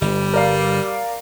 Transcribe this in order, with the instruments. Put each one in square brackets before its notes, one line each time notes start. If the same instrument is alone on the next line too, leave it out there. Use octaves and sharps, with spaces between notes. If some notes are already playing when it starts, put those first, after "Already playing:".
[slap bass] G1 [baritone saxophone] G3
[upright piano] A#4 D5 F5